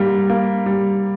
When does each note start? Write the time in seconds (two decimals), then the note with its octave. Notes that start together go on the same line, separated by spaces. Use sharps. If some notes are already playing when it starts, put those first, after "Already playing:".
Already playing: G#2 G3 A#3
0.30 A#3
0.66 G3